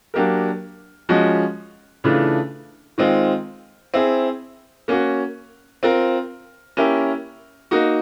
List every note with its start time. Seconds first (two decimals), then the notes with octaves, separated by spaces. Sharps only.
0.14 F#3 A#3 D4 G4 A#4
1.09 F3 G#3 C#4 F#4
2.04 C#3 E3 A3 D4 F4
2.98 D#3 G#3 C4 F4
3.94 C4 E4 G#4
4.88 A#3 C#4 F#4
5.83 C4 F4 A#4
6.77 A#3 C#4 E4 G4 A#4
7.71 A#3 D#4 F#4